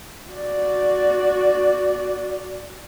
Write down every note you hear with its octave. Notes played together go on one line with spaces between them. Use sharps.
F#4 D5